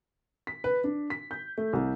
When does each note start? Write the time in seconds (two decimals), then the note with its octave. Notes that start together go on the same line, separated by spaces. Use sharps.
0.47 B6
0.64 B4
0.84 D4
1.10 B6
1.31 G6
1.58 A3
1.73 C2